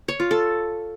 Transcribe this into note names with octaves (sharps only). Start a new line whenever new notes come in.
C#5
F4
A4